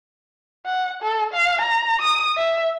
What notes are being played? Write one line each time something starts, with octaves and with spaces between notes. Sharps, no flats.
F#5
A4
F5
A#5
D#6
E5